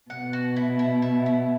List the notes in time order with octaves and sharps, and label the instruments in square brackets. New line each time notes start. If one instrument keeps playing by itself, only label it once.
[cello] B2 [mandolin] F#5
[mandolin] F#4
E4
E4
E4
E4